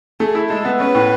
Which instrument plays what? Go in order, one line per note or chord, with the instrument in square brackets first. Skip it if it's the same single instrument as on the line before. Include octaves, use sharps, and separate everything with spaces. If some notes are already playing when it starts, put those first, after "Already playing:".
[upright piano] A3 [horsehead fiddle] G#4
[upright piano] E4
[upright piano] G#3 [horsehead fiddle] A4
[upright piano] B3
[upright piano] C#4 [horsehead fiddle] B4
[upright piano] A2